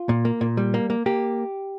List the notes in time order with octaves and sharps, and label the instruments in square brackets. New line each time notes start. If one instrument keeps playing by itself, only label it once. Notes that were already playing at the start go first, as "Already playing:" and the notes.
Already playing: [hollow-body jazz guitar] F4
A#2
A#3
A#2
G3
A#3
A#3
A#3 G4